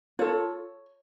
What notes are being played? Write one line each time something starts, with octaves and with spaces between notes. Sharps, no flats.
F4 A4 C#5